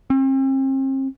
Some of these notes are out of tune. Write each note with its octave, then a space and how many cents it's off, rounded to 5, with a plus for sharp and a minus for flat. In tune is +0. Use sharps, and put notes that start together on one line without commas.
C4 +40